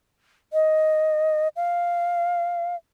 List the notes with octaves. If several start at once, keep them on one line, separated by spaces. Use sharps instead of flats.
D#5
F5